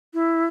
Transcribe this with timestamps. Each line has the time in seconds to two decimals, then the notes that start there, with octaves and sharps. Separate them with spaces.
0.14 E4